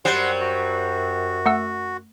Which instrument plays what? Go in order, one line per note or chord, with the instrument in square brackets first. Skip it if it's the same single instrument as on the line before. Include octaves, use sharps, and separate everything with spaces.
[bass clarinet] F#2 [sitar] F#3 G3 C5 [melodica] F#5 C6
[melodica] F#4
[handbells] A3 F#5 E6